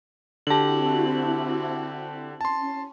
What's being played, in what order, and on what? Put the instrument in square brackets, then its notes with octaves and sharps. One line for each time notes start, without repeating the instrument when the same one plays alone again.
[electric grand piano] D3 G4 [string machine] C4 E4 F#4 [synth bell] A5 F#7
[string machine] C#4 [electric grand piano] A5 C6